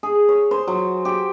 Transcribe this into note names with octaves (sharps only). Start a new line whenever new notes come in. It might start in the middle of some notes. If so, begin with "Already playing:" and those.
G#4
C#5
C5
F#3
G4